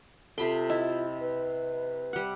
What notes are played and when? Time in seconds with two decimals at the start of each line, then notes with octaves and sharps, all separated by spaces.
0.38 C3 F4 A4 B5 C6
0.70 E4 D#5
1.20 B4
2.13 G3 F#5